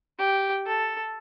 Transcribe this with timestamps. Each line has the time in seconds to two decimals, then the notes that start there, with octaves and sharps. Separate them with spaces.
0.19 G4
0.66 A4